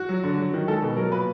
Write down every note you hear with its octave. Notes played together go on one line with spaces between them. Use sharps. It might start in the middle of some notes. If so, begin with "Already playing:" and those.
Already playing: F#4
F#3
D3
F#3
D#3
G#3 A4
B2
F#3 A#4
A#2 B4